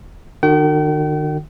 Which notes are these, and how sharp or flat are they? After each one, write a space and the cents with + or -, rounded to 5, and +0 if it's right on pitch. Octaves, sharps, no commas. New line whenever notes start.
D#3 -45 F#4 +0 G5 -40